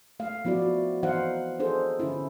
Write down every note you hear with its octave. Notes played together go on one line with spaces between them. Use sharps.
A3 F5
F3 B3 E4 F#4 D5
F#4
E3 B3 D#4 C5 F5 F#5
D4 D#4 G#4 A4 C5
D3 C#4 E4